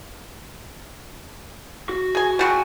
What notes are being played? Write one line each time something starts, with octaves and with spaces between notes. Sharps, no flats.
F#4
G#4 G#5
G3 F#4 G#4 G5 G#5